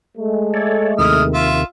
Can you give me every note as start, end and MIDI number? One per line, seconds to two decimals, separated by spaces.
0.18 1.35 56
0.18 1.35 57
0.54 0.94 69
0.54 0.94 73
0.54 0.94 74
0.99 1.65 39
0.99 1.65 48
0.99 1.65 51
0.99 1.23 64
0.99 1.23 87
0.99 1.23 89
1.34 1.62 65
1.34 1.62 76